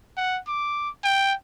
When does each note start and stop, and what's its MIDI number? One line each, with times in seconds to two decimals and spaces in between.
0.17 0.39 78
0.48 0.89 86
1.04 1.33 79